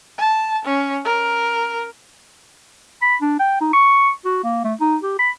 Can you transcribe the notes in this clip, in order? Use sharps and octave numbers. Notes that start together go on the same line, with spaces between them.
A5
C#4
A#4
B5
D4
G5
D#4
C#6
F#4
A#3
A3
D#4
G4
B5